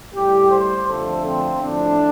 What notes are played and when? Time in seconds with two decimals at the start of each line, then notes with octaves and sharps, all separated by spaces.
0.14 A2 G3 G4
0.51 C5
0.89 F2 D3 F3 A3 A4
1.26 C4
1.63 A2 F3 A3 D4